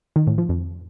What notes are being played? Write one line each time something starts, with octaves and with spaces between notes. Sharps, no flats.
D#3
A2
F3
F2